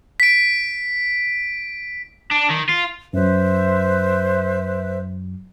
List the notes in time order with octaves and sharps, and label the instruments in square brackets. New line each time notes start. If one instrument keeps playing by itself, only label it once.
[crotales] B6 D7
[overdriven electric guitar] D4
D#3
F4
[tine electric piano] F#2 F#3 [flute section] B4 C5 E5